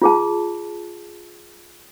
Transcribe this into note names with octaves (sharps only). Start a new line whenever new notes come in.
F4 G#4 A5